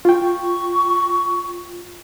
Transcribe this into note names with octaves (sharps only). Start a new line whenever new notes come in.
F4 G5 C#6